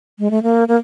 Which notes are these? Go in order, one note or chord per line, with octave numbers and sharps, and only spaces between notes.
G#3
A3
A#3
A#3